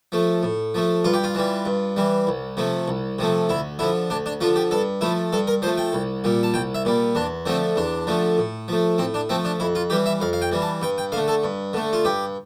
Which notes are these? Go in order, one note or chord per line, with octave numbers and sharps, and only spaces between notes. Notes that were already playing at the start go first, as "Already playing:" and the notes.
F3 A3
A2
F3 A3
G2 F4
G4
F4
E3 G3
G2
E3 G3
C2
C3 F3 A3
C2
C3 F3 A3
D2 E4
D3 F3 E4
D2 D4
D4
D3 F3 F4
G4
G2 A4
F3 A3 E4
G2 A4
A#4
F3 A3 C5
G5
C2
A#2 G3
A5
C2 G5
E5
A#2 G3
E2 D4
D3 F3 A3 C4
E2 D4
D3 F3 A3
A2
F3 A3
A2 C4
D4
F3 A3 C4
D4
F2 E4
F4
E3 G3 G4
E5
F2 F5
F5
G5
E3 G3
A5
G2 G5
G5
D3 A3 F5
A4
G2
D3 A3
F4
G2 G4